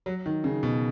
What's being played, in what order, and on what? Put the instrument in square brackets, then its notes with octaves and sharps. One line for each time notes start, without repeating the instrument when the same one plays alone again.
[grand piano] F#3
D#3
C#3
B2